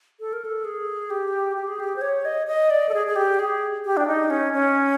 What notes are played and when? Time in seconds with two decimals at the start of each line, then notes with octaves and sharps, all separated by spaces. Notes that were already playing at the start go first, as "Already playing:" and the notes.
0.20 A4
0.33 A#4
0.45 A4
0.65 G#4
1.10 G4
1.57 G4
1.68 G#4
1.80 G4
1.96 C5
2.01 C#5
2.25 D#5
2.47 D#5
2.70 D5
2.89 A4
2.94 G#4
3.07 G#4
3.16 G4
3.39 G#4
3.85 G4
3.97 D4
4.07 D#4
4.30 C#4
4.53 C#4